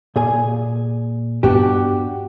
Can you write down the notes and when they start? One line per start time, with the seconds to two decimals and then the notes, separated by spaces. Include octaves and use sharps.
0.16 A#2 G#4 G#5
1.43 G2 B3 D4 F#4 G4